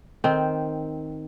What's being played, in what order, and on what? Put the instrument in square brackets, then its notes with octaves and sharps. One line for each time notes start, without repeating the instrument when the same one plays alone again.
[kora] D#3 C4